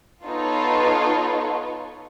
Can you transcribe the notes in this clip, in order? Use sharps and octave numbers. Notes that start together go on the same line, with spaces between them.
B3 D#4 F4 A4 B4 C#5